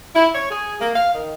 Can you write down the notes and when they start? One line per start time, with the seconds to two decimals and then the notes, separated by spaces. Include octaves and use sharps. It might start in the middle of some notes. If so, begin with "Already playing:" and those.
0.15 E4
0.34 C#5
0.51 G#4
0.80 A#3
0.96 F5
1.13 D#3